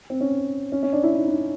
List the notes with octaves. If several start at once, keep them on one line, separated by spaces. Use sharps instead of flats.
C4
C#4
C#4
C#4
D4
E4
D#4
D#4